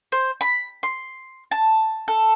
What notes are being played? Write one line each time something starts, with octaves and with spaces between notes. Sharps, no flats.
C5
B5
C6
A5
A4